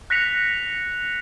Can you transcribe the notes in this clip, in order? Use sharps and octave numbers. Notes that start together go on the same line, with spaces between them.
F#6 A#6 B6 C#7 F7